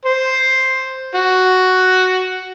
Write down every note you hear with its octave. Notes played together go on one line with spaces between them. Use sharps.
C5
F#4